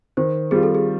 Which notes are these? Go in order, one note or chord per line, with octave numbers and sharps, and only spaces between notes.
D#3 C5
G3 C4 F4 G#4
A4
G#4